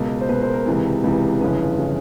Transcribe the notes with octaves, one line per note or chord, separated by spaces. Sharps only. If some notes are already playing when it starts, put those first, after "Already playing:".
Already playing: C#2 B2 A#4
C5
C#2 B2 B4
A#4 C5
A#4
C#2 C3 E3
C#2 C3 E3
G1 F2 C#3 E3 B4
C#3 E3